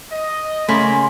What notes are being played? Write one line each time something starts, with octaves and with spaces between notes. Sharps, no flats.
D#5
C#3 A3 A#3 A#4 B5 C6 B6